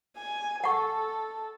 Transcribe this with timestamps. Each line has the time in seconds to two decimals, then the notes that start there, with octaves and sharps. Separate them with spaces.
0.17 G#5
0.64 A4 F#5 C#6